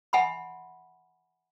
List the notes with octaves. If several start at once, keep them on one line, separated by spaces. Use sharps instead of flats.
E5 F#5 G#5 B5 C6